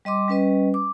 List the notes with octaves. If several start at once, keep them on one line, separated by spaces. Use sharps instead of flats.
G3 D#5 C6 D6
G3 C#4 B4 D#5
D6